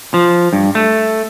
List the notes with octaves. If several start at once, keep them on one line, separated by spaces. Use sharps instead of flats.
F3
G2
A3